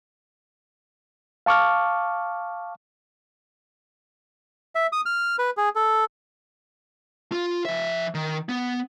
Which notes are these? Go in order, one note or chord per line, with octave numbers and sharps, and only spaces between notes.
F5 A5 C#6 D6 F6
E5
D#6
F6
B4
G#4
A4
F4
F3 E5
D#3
B3